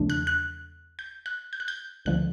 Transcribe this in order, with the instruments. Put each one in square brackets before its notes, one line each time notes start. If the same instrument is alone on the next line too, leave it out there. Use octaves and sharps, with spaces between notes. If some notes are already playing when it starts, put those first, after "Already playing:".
Already playing: [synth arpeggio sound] E2 C#3 F3 A3 D4
F#6
F#6
G6
F#6
G6
F#6
G6
D2 D3 F3 F#6